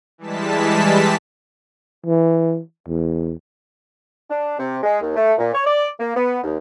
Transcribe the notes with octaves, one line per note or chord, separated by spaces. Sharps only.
E3 G3 G#3 A5 B6
E3
E2
D4
C3
G#3
D#2
A3
A#2
C#5
D5
A#3
B3
D#2